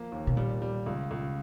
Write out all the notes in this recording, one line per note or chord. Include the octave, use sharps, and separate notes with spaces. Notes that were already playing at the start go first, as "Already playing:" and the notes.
Already playing: F3 A#3
D#2
B2
A#2 G3
G3
C#2
C#2